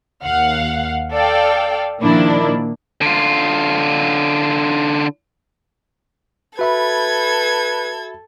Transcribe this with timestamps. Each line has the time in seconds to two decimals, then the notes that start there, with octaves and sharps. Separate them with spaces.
0.24 D#2 F5 F#5
1.12 A4 D5 F5 G5
2.01 A#2 D#3 F3 A#3 D4 E4
3.02 D3 F4
6.59 F#4 A4 B4 E5 B5 G#6